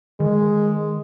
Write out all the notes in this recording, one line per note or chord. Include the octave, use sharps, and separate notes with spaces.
D#3 G#3